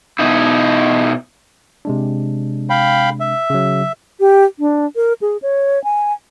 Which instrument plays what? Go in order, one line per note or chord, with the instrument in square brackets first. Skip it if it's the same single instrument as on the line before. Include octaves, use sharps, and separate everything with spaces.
[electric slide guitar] B2 D#4 E4
[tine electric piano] C3 G#3 D4
[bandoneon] F5 G5 B5
E5
[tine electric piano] C#3 F#3
[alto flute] G4
D4
A#4
G#4
C#5
G#5